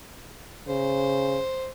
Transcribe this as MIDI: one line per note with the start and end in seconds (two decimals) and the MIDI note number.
0.69 1.40 49
0.69 1.68 72